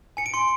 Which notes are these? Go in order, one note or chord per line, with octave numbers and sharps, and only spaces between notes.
G#5 C#7
D7
C6 C#7